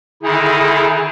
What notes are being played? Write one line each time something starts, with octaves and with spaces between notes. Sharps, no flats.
D3 D#3 D#4 E4 G#4